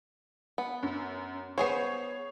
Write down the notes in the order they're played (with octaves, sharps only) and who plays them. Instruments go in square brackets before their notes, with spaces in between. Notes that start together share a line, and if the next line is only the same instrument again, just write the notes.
[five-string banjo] B3
[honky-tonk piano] F#2
[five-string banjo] B3 G#4 C5 [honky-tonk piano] C#5 C7